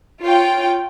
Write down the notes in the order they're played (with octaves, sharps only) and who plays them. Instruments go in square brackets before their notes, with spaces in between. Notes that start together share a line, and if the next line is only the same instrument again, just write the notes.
[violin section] F4 C#5 G5